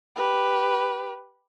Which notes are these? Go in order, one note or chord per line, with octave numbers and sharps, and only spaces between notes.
G4 B4